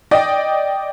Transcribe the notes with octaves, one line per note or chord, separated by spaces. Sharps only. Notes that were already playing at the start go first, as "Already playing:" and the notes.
D5 D#5 G5